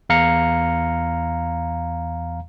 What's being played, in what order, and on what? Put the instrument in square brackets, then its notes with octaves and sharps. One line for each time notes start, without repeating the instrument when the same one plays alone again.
[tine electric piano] E2 F5 A#5 C#7